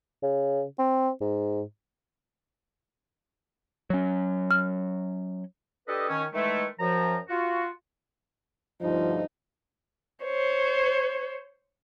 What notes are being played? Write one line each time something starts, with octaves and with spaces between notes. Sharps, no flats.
C#3
C4
G#2
F#3 C#4
F6
D4 G4 A4 B4 D#5
D#3 C#4
D#3 E3 G#3 A3
F#2 F3 A#5
F4 F#4
D2 G2 F3 D#4
C5 C#5